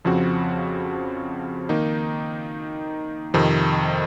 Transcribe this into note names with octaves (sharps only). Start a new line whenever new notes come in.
F2 C#3 F3 C4 F#4
D#3 A#3 D#4
F2 C3 D#3